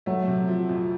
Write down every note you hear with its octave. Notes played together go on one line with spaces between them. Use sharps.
F#3 A3
C3
F3
F2